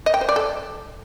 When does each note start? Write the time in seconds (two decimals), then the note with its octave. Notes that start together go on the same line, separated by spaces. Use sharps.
0.06 D#5
0.14 G5
0.21 C5
0.29 D5
0.36 A4